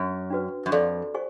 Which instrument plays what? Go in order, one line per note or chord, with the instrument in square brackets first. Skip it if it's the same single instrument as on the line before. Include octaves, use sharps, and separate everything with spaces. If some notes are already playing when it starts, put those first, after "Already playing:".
Already playing: [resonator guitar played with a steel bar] F#2
[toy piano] D4 F#4 B4
[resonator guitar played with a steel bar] F#2
[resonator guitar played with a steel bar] F2 [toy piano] A4 D5 F5
[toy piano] G4 C5 F5 G#5 C#6